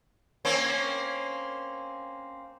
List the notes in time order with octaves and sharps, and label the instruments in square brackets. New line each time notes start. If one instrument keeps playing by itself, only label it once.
[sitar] A#3 C4 C#4